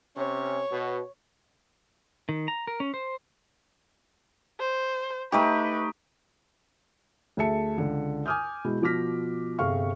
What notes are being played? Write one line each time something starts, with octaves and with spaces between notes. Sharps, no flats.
C3 C#4 C#5
B2
D#3
A#5
A#4
C#4
C5
C5
A3 D#4 G4 B4
D2 A3 G#4 E5 A5 C#7
C#2 D3
G#5 D6 D#6 F6 G6
B2 G#3 E4
B2 F3 D6 F6 A#6 B6
G1 C3 G#4 F5 C#6 F6